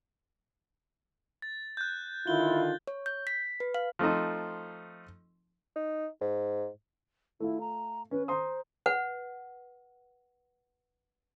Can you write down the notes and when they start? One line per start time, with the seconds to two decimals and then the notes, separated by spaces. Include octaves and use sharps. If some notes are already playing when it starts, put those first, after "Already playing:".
1.42 A6
1.77 F#6 G6
2.27 D3 D#3 E4 F4 G7
2.87 C#5
3.06 G6
3.27 B6
3.60 B4
3.74 F5
3.99 F3 A3 C4 D#4
5.76 D#4
6.21 G#2
7.40 A3 E4 F4
7.60 A#5
8.11 C#4 B4
8.28 C5 A#5 C6 D#6
8.86 B4 F#5